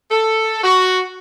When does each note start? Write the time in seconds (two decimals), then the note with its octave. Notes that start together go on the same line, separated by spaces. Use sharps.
0.11 A4
0.63 F#4